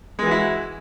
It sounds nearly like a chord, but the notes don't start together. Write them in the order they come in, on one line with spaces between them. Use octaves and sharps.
G#3 E3 F#4 E4